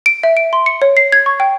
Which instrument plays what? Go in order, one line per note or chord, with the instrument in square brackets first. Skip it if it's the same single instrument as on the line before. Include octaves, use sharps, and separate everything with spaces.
[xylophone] D7
E5
D7
C6
C#7
C#5
C7
G#6
C#6
G5